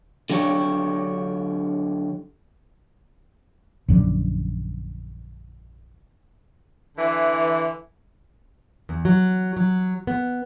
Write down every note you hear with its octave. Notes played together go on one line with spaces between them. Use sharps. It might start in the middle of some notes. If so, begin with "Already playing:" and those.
D3 F#3 D4 G4 C#5
A#1 F#2 D3 F#3
D3 E3
E2
F#3
F#3
B3